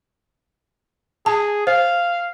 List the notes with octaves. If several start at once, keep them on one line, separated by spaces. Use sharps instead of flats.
G#4 A5
C5 F5